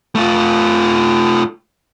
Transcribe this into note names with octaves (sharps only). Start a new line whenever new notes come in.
A3 F4